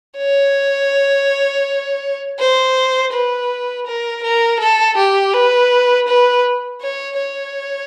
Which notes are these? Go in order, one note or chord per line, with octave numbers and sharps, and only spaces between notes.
C#5
C5
B4
A#4
A#4
A4
G4
B4
B4
C#5
C#5